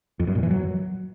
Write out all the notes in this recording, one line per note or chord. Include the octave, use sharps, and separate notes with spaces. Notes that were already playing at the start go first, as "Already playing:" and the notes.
F2
F#2
A#2
E3
F#3